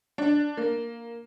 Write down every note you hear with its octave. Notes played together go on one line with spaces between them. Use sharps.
D4
A#3